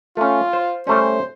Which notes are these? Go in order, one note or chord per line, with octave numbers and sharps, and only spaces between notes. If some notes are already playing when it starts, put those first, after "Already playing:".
A3 C#4 F4
C5
G3 A3 C#4 C5